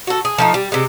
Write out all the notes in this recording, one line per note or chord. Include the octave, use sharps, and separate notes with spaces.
F#4 A4
G#4
F3 A3 D#4
G3
C3 G#3